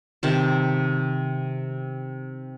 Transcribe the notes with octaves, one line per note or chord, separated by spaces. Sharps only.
C3 D#3 A5